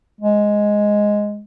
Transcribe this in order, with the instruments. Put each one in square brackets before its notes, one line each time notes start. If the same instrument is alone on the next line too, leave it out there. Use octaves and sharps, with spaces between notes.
[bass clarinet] G#3